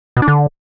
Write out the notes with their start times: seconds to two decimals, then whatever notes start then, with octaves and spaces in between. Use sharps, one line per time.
0.17 B2
0.22 D4
0.28 D3